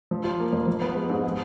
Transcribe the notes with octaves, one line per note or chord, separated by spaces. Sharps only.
F3
F4
A#3
F2
F3
B3
G#3
G#2
G#3